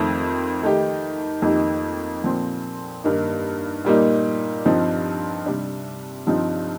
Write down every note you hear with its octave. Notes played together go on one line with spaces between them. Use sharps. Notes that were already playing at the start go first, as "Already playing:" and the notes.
Already playing: F2 D#3 A3 C4
D#3 A3 D#4 G4
F2 D#3 A#3 D#4 G4
A#2 F3 C4
G2 D#3 A#3 D#4
A#2 G3 A#3 D#4
G2 F3 C4 D#4
C3 G3 D4
G2 F3 C4 D#4